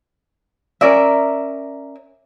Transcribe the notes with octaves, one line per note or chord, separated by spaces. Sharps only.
C#4 A#4 D5 E5